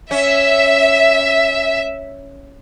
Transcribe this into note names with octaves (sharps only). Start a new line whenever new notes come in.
C#4 E5